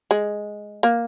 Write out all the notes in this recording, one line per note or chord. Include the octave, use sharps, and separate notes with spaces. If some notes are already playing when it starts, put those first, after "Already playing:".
G#3
A#3